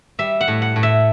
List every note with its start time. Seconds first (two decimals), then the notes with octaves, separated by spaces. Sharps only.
0.19 G3 E5
0.41 F#5
0.48 A2
0.62 F#5
0.76 A2
0.83 E5